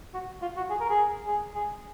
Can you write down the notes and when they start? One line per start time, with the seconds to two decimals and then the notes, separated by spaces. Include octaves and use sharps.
0.14 F#4
0.42 F4
0.57 F#4
0.70 G#4
0.81 A#4
0.90 G#4
1.27 G#4
1.55 G#4